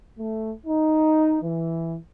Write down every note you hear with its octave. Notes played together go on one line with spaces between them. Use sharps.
A3
D#4
E3